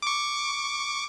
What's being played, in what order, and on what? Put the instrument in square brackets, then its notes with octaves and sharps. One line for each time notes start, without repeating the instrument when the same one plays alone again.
[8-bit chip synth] C#6 D6